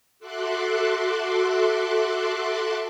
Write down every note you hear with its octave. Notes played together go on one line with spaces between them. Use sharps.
F#4 A4 E5 C6 D6 F#6